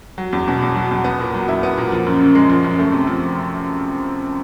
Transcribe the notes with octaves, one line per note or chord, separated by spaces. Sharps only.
F#3
E2
B2
E2
F#3
E2
B3
A#2
F#3
E4
B3
A#2
F3
F#2
C#3
G#3
F3
F#2
A3
C3
F3